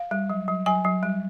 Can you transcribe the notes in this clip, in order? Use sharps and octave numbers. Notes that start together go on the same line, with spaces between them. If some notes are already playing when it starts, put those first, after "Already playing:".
Already playing: F5
G3
F#3
F#3
F#3 G#5
F#3
G3